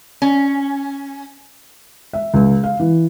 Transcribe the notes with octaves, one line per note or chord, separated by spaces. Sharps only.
C#4
E5
C#2
F5
E3